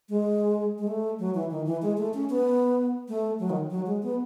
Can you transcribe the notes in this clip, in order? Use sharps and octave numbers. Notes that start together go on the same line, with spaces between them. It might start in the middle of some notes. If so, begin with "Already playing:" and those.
G#3
G#3
A3
F#3
E3
D#3
E3
G#3
A3
C#4
B3
A3
F#3
D#3
F#3
G#3
B3